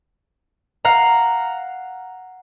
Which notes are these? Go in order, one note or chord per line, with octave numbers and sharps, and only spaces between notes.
F5 F#5 A#5